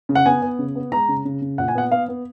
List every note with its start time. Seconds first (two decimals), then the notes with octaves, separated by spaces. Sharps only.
0.09 C#3
0.15 F#5
0.26 B3 G#5
0.42 B3
0.59 C#3
0.75 B3
0.92 G#3 A#5
1.08 C#3
1.25 C#3
1.42 C#3
1.58 A#2 F#5
1.68 G#5
1.75 B3 F#5
1.91 B3 F5
2.08 B3